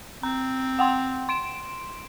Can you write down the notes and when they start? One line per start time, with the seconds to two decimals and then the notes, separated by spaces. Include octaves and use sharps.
0.23 C4 A#5
0.79 F#5 G5 C6
1.29 C6 D7 E7